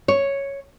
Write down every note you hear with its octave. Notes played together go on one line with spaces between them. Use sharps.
C#5